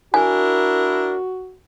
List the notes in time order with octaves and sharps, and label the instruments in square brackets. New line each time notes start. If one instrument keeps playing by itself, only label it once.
[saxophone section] D4 E4 A#4 [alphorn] F#4 [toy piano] G#5